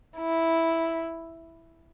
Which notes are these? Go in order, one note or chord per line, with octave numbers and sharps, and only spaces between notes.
E4